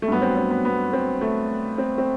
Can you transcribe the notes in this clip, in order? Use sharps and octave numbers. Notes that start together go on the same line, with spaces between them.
A3
G2 F#3 B3
C4
C4
B3
B3
C4
A3
C4
C4